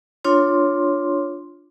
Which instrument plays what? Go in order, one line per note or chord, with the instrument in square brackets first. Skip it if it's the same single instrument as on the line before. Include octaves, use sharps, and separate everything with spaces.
[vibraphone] D4 F4 C#5 C6